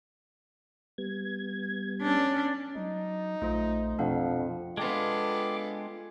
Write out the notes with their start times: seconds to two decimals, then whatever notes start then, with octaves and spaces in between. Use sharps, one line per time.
0.98 G3 B3 G#6
2.02 C#4 D4
2.76 F#3 D#4
3.42 A#1 A3 F4 C5
3.99 F2 B2 D4 F5 F#5
4.77 G#3 B3 D4 F4 A4 G5 D6